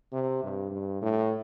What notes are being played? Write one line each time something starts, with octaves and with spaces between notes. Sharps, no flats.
C3
G2
G2
A2